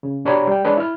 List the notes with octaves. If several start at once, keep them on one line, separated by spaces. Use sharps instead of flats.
C#3
B2 D4 G4 C#5 A#5 B5
G3 G5
G#3 D4 B4 C#5 D#5
E4 F6